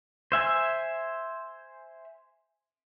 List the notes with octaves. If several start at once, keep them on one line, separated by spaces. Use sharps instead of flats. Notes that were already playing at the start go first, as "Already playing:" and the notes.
C5 E5 G#5